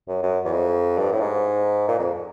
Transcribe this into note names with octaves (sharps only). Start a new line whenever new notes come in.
F#2
F#2
E2
F2
G2
A2
G#2
A#2
F2